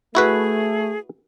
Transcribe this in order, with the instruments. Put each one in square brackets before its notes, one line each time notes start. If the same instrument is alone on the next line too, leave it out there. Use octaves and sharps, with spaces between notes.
[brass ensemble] A3 [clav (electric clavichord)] E4 F#4 B4 [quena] G#4